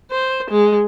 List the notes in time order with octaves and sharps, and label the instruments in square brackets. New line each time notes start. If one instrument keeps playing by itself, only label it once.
[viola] C5
G#3